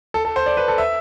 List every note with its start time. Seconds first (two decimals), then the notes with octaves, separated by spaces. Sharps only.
0.14 A4
0.25 A4
0.36 C5
0.46 D5
0.57 B4
0.68 A4
0.78 E5